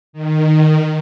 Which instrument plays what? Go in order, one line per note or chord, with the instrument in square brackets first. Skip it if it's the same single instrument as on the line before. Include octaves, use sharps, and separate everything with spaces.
[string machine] D#3